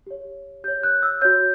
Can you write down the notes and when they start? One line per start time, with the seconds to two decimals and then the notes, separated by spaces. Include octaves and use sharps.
0.07 G4 C#5
0.64 G4 C#5 G6
0.83 F#6
1.03 E6
1.22 F#4 C#5 G6